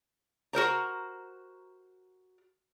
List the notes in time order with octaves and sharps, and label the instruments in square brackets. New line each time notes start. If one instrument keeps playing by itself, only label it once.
[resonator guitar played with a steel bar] F#4 A#4 C5 A#5